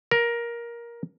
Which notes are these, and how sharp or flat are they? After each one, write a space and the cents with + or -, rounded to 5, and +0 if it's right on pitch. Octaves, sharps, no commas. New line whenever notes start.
A#4 +15